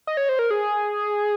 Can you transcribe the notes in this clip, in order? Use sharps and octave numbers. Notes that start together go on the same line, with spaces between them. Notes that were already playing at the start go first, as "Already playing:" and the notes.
D#5
C#5
C5
A#4
G#4